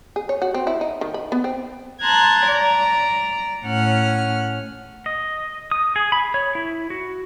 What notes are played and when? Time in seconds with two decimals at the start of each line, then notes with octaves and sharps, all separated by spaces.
0.16 G#4
0.29 C#5
0.42 F#4
0.54 C4
0.67 E4
0.81 D#4
1.01 D#3
1.14 B5
1.32 B3
1.44 C4
2.02 A5 A#5 C6 F#6 G#6
2.47 D5 A#5
3.65 A2 C#4 F#5 F6
5.06 D#5
5.71 D#6
5.96 G#4
6.12 B5
6.34 C#5
6.55 E4
6.90 F#4